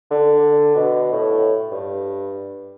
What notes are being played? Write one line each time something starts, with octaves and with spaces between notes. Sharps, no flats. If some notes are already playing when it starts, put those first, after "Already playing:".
D3
B2
A2
G2